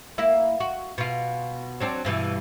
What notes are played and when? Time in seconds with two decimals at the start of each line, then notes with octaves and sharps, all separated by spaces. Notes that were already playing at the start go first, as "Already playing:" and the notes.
0.18 A#3 E4
0.60 F#4
0.98 B2 F4
1.80 F#3 C4 D4
2.05 G2 B2 E3